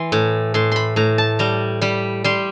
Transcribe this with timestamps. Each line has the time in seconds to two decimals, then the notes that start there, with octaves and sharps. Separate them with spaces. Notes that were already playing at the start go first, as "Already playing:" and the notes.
Already playing: E3 C6
0.12 A2
0.54 A2 C6
0.72 B5 C6
0.96 A2 A#5
1.18 A5
1.39 G3 A#5
1.81 G3 B5
2.24 G3 C6